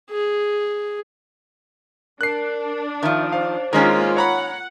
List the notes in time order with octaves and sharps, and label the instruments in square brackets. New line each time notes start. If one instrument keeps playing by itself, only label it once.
[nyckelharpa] G#4
[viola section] D4 [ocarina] A#4 [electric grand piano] F#6 C7
[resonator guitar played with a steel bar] D#3 F3 [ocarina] E5
[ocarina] C5 [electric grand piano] F5
[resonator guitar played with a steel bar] D#3 C#4 [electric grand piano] G#3 A#4 [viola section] A#3 F4
[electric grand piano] C#5 A#5 B5 [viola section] F#5